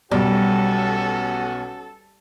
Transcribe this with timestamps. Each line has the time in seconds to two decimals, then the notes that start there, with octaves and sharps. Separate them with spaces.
0.12 B1 G3 B3 C#4 F#4 A4